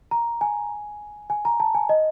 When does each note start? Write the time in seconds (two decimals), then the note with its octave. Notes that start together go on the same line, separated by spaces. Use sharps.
0.11 A#5
0.41 G#5
1.30 G#5
1.45 A#5
1.60 A5
1.75 G#5
1.89 D#5